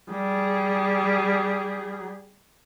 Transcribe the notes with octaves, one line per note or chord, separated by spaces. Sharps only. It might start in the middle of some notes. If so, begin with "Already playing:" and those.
G3 G#4